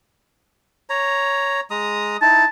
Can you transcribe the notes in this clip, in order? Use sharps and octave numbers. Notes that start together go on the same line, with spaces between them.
C#5 A#5
G#3 A#5 D#6
D#4 E4 A5